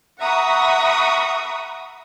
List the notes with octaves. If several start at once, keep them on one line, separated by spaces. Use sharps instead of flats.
E5 F#5 A#5 B5 C#6 D#6